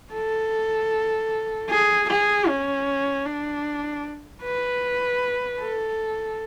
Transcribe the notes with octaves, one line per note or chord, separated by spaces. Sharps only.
A4
G#4
G#4
C#4
D4
B4
A4